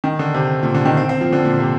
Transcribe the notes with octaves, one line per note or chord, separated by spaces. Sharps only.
D#3
D3
C3
A#2
D3
D#3
C4
C4
F3
D3
A#2
C3